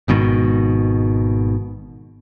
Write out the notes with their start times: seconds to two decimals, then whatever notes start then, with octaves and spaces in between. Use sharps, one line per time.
0.08 G#1 G#2 B2 D#3